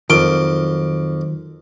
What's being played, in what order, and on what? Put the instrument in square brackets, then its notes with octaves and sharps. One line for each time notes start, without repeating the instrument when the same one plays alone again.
[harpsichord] F2 [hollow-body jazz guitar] D#3 F#3 [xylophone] A#4 D7